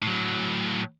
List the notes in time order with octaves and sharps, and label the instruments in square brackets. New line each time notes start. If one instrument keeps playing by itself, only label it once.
[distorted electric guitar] A2 F#3